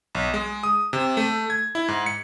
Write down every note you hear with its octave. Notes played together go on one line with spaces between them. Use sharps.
B1
G#3
D#6
C3
A3
G#6
E4
G#2
C#7